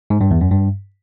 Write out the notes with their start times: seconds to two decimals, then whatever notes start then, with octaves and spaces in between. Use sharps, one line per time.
0.10 G#2
0.21 G2
0.31 E2
0.41 F#2
0.51 G2